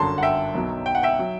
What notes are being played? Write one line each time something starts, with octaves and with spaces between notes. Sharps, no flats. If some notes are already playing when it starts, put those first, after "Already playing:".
Already playing: G1 F#2 D3 F#3 A5 C6
F#5
E5 G5
B1 B2 F#3
G5
F#5
E5 G5
F#3